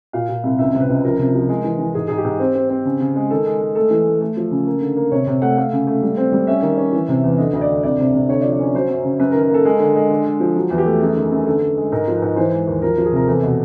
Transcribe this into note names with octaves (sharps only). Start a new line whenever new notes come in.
A#2 F5
A#2
C2
C#2 E5
C3
B4
C#2
F3 A#4
C3
F3
G#3
E3
E3
G#2 G#4
G#2 G#4
G4
G#2
C4
C4
C4
C#3
C#3
G#3
D#3 A4
G#3
G#3
A3 A4
E3
A3
A3
F3
C#3
A#3
D3
A#3
C3 C#5
C3
A3 F#5
A3 F5
C#3
A3
G3
C4
G3
C#4 E5
D#3
C#4
E3
C3
E2
D3 D#5
D2 D#5
D5
D3
C2 D5
C3
C3
D3 C#5
D5
F3
D5
C#4 C#5
F#3 C5
F#2
C#3
F#2 B4
A#4
D#3
A#4
A#3 A4
G#3
D3
G#3
D3
G#3
F3
F#3
E2
G4
A3
F#2 G#4
D#3
F#2
D3 A4
D3
G#3
G#2 A#4
F3
B4
G#2
E3 C5
G#3
D#2
F3 A#4
F3
G#4
C3 A#4
E2 A4
B2